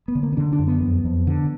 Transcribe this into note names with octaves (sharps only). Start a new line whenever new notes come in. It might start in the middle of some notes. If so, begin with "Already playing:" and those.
B3
D3
A#3
B3
D3 D4
D4
F#2
B3
F2
F2
D3